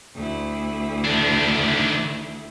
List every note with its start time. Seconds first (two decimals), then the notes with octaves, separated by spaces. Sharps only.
0.15 D2 E4
1.05 D#3 D4